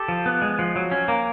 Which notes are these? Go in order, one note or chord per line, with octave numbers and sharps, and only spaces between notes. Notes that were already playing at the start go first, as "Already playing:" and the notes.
Already playing: G4 A4
F3
B3
G#3
F3
F#3
C#4
A#3